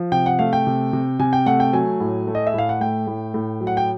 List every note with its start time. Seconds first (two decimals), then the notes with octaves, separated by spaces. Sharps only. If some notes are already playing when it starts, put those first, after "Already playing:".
Already playing: F3
0.12 C3 G5
0.26 F#5
0.39 A3 F5
0.53 G5
0.67 C3
0.93 C3
1.19 C3 G#5
1.33 G5
1.46 A3 F#5
1.60 G5
1.73 F#3 G#5
2.00 A2
2.27 A3
2.35 D#5
2.47 E5
2.54 A2 F5
2.69 F#5
2.80 A3 G5
3.07 A2
3.34 A2
3.61 F#3
3.67 F#5
3.77 G5